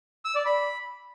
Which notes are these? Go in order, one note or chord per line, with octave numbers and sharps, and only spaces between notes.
E6
D5
B5